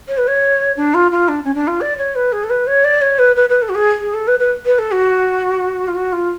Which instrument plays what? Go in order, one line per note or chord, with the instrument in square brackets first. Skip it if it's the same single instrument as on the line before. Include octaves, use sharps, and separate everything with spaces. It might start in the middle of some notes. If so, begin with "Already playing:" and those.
[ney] C#5
B4
C#5
D4
F4
F4
D4
C#4
D4
F4
D5
C#5
B4
G#4
A4
B4
C#5
D5
C#5
B4
B4
B4
A4
F#4
G#4
G#4
A4
B4
B4
B4
A4
F#4
F4
F#4
F4